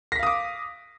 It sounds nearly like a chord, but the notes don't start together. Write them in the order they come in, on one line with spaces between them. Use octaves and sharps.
A#6 B6 F5 D#6 D6